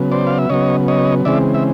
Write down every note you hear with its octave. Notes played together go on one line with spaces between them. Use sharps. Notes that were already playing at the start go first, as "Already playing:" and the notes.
Already playing: C#3 F#3 B3
C5 D5
F5
E5
C#3 F#3 B3 C#5 D#5
C#5 D#5
C#3 E3 G#3 C4 D5 E5
E5